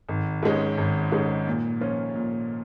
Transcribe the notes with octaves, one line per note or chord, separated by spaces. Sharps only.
G#1
G#2 G#3 C#4
G#1
G#2 G#3 C#4
A#2
F3 C#4 F4
A#2